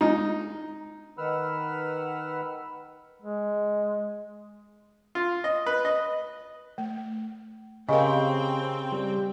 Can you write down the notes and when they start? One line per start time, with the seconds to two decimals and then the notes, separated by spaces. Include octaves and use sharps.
0.01 G#3 D4 D#4 F4
1.18 D#3 B4 F#5 B5 E6 F6
3.22 G#3
5.15 F4
5.44 D#5
5.66 B4
5.85 D#5
6.78 A3
7.89 C#3 C4 G4 A#4 D#5 F5 G5
8.92 G3